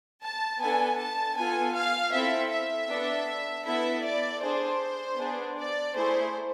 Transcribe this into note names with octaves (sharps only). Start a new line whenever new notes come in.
A5
B3 D4 A4 G#5
A5
B3 F4 A4 G#5
F5
C4 E4 A4 E5
E5
B3 D4 A4
B3 E4 A4 E5
D5
D4 G#4 C5
B3 D4 G#4
D5
A3 E4 G#4 C5